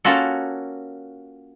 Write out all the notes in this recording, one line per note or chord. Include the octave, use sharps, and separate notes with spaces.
A#3 C#4 F4 F#4 A4